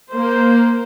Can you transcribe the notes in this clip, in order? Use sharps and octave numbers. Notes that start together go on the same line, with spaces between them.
A#3 C5